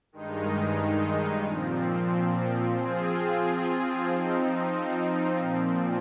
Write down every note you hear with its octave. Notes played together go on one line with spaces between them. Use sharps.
G2 D#3 G#3 D#4
A#2 F3 C4
F3 C4 F4 G#4
F3 C4 D#4
A#2 F3 C4